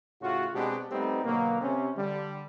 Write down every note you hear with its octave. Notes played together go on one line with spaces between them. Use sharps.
A2 C#3 F4 F#4
B2 G#3 B3 C4 D4 G4
G3 A3 B3 C4 D#4 G4
B2 D3 F#3 A#3
C3 C#4
D3 G3